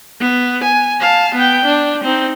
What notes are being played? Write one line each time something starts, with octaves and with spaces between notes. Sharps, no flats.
B3
G#5
F5 A5
B3 G5
D4
C4 D#4